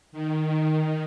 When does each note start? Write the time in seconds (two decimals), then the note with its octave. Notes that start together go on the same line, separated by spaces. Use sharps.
0.12 D#3